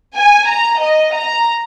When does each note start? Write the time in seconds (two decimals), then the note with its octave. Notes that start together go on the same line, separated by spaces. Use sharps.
0.15 G#5
0.48 A#5
0.81 D#5
1.15 A#5